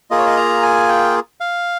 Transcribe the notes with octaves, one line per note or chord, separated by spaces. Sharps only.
A#3 F4 G#4 D#5
C#5
D#5
A#5
G#5
G5
F5